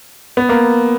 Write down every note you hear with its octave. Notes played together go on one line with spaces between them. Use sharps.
B3
A#3